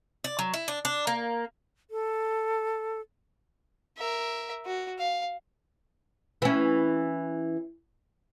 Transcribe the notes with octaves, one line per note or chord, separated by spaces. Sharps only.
D5
F#3
E4
D4
D4
A#3
A4
A#4 E5
F#4
F5
E3 C#4